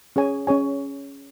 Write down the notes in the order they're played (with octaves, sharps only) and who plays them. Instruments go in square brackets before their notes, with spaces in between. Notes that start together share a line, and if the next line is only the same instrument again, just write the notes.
[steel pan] C#4 G#4 C#5 G#5
C#4 G#4 C#5 G#5